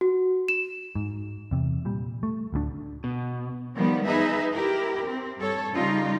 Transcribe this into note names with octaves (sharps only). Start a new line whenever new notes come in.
F#4
E7
G#2
E2 C3
A#2 G3
A3
D1 D2 F#3 D4
B2
D#3 F3 G3 B3
D#4 G#4 B4 E5
E4 G4 A#4
C4
G2 A4 C#5
C#3 G3 D#4 F4